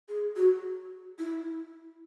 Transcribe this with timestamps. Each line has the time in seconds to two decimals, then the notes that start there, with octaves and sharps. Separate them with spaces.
0.09 G#4
0.36 F#4
1.19 E4